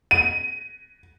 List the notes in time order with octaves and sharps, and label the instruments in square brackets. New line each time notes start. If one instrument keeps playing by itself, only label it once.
[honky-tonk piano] D#7